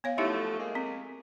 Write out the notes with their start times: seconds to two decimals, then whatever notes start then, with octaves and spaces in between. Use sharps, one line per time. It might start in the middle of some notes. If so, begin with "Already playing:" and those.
0.04 B3 C#5 F5
0.18 F3 F#3 A3 D#4 E4 G4
0.58 G#3 A#3
0.75 C4